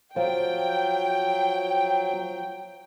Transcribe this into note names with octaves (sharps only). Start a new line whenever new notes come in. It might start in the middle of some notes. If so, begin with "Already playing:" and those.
F3 F#3 G5